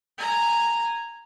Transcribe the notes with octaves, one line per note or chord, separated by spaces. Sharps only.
G#5 A#5